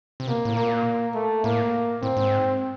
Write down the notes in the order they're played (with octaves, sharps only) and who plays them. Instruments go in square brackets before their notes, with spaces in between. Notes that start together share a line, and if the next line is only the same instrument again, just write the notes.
[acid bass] C3
[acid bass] B2 [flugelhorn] A#3
[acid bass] A2
[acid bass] A#2 [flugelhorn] A#3
[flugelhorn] A3
[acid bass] A2 [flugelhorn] A#3
[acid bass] A2 [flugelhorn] C4
[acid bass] G#2